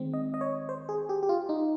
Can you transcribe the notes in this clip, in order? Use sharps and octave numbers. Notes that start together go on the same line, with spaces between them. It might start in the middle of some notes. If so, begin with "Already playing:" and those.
Already playing: D#3 G#3 C4
D#5
D#5
C#5
C5
G#4
G4
G4
F4
D#4